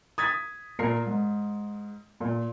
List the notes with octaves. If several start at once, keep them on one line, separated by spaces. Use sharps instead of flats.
D#6 G#6 A6 B6
A#2 A#4 C7
G#2
A#2